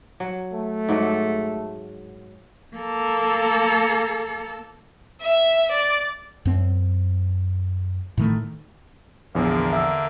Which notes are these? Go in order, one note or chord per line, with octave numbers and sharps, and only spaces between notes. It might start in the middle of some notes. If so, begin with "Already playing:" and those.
F#3
A3
G#2 F#3
A#3 A4
E5
D5
F#2 C4
A2 D#3 A3
A#1 E2 D3 A#3
E5 E6